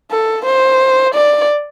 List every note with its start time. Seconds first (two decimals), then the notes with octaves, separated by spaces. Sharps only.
0.11 A4
0.45 C5
1.15 D5